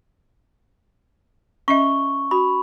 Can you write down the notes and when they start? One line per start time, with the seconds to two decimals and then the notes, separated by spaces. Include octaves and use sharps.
1.68 C#4 D#5 E5 C#6
2.31 F#4 B5